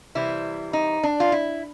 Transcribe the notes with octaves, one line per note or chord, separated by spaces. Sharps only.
C3 E3 G3 C4 E4
D#4
D4
F4
E4